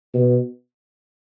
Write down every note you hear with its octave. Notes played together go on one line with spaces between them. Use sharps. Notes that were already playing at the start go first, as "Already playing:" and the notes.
B2